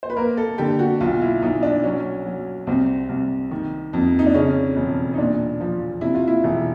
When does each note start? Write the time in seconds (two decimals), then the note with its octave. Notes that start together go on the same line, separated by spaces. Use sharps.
0.03 C5
0.10 B4
0.16 A#3 A#4
0.37 A4
0.58 D3 G4
0.79 F#4
1.01 B1 F4
1.22 E4
1.42 B1 D#4
1.63 D4
1.83 F#3 C#4
2.26 F#3
2.67 C2 C4
3.09 C2
3.51 D#3
3.93 F2
4.19 D#4
4.26 D4
4.34 C#3 C#4
4.76 E1
5.14 D#4
5.18 A#2 D4
5.61 F3
6.01 C3 E4
6.15 F4
6.28 E4
6.44 E1